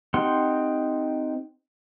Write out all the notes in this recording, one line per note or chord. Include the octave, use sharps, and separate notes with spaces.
C4 D#4 G4 F#5 C6